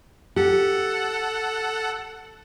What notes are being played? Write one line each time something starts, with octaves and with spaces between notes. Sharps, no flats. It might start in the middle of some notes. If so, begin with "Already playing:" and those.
G4 A4 F#5